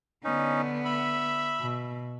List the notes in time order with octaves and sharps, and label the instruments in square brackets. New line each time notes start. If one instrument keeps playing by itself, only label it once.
[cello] D3 B3 [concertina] C#4 D#4
[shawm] E5 [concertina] B5
[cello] B2